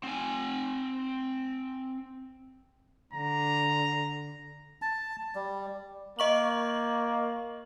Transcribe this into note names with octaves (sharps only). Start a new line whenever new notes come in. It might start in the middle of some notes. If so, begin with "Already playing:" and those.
C4 G#5
D3 A#5
A5
G3
A#3 D#5 C#6 F#7